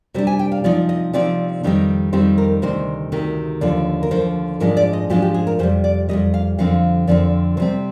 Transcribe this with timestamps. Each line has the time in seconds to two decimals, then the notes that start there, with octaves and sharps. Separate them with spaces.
0.14 C3 G3 D4 C5
0.27 G#5
0.39 G5
0.52 F5
0.64 C3 F3 C4 D#4 D5
0.89 D#5
1.13 C3 F3 C4 D#4 D5
1.63 F2 D#3 G3 C4 D#4
2.13 F2 D#3 G3 C4 D#4 C5
2.38 A#4
2.62 D2 C3 D#3 C5
3.12 D2 C3 D#3
3.61 D#2 D3 F3 D5
4.03 A#4
4.11 D#2 D3 F3 C5
4.60 G#2 F3 G#3 D4 A#4
4.77 D5
4.93 D#5
5.10 G#2 F3 G#3 D4 G4
5.22 G4
5.34 G#4
5.47 A#4
5.59 F2 C3 G3 C5
5.84 D5
6.09 F2 C3 G3 D#5
6.34 F5
6.58 F2 D3 F3 C4 F5
7.07 F2 D3 F3 C4 D5
7.57 C3 G3 C4 C5